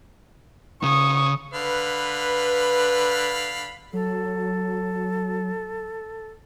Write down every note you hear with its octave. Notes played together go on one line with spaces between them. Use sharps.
C#3 C#6 D#6
D3 B4 F5 B5
F#3 A4